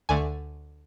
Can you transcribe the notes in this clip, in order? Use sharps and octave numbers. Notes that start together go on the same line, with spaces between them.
D2 D3 A3 G#5